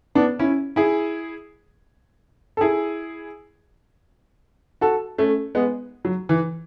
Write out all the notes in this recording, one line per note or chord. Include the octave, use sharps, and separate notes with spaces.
B3 D4
C#4 E4
E4 G#4
A4
E4 G#4
F#4 A4
A3 C#4
G#3 B3
F#3
E3